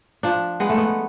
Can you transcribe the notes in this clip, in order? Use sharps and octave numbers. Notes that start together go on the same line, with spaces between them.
F3 D4
G#3 B3
A3
B3